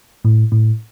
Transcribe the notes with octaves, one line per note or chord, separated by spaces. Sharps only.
A2
A2